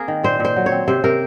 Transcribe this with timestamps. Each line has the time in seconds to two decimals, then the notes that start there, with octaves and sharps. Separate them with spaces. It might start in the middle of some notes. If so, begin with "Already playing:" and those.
Already playing: A#3 C4 G#4 A#4
0.08 D#3
0.23 A#2 C5
0.40 A#2 C5
0.56 F#3
0.66 C#5
0.72 C4
0.88 C3 C5
1.04 C3 A#4